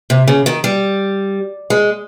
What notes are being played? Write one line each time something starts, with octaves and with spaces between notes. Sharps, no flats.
C3
C#3
D#3
G3
G#3